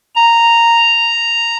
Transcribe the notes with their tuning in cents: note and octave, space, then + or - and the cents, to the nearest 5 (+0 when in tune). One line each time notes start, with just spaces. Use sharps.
A#5 -5